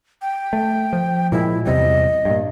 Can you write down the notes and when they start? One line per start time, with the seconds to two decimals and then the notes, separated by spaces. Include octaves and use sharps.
0.22 G5
0.53 A3
0.93 F3
1.32 A#2 F3 G#3 E4
1.65 E2 C3 G3 D#5
2.25 G2 A#2